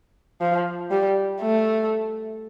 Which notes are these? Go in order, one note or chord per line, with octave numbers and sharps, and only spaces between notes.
F3
G3
A3